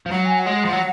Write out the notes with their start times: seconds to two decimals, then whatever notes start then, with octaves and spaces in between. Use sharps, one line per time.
0.06 F3
0.12 F#3 F#5
0.26 G#5
0.39 F#5
0.46 G#3
0.65 F3
0.73 F#3